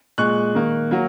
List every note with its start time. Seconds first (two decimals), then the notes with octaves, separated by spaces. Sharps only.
0.18 A#2 G#3 C#6 F#6
0.55 D#3 A#3
0.91 F#3 A#3